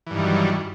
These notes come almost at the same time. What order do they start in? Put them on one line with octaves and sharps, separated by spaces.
E3 G2 D#3 G3 F#3